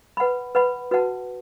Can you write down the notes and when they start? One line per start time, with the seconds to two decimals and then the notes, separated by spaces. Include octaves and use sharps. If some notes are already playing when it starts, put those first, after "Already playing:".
0.17 B4 F#5 B5
0.55 B4 F#5 B5
0.91 F#4 B4 F#5 A5